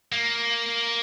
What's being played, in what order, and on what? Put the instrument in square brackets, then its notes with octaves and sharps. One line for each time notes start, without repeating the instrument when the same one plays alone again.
[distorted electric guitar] A#3